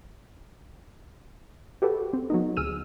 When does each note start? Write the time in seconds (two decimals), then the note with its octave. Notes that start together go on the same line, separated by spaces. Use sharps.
1.82 F#4 G4 A4 B4
2.13 C4
2.30 F#3 B3 D#4
2.57 D2 G#4 E6 F6 D#7